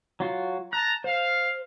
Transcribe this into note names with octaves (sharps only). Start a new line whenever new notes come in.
F#3 F4 F#4
A5 A#5 F#6
C5 F5